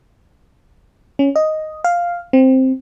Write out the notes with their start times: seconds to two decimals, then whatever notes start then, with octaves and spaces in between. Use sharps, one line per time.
1.19 C#4
1.36 D#5
1.84 F5
2.33 C4